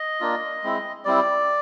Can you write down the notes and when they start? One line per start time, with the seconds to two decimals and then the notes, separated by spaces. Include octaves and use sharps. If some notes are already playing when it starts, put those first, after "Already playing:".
Already playing: D#5
0.21 A#3 D4 F4
0.63 G#3 C4 E4
1.05 G3 C4 E4 D5